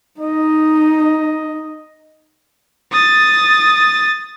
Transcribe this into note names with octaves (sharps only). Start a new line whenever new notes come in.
D#4 D#5
D#6 A6